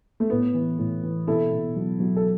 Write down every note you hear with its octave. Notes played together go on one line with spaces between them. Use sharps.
A3
A2 B3
E3
A2
E3
B2 E4 A4
B2
F#3
F#3
A4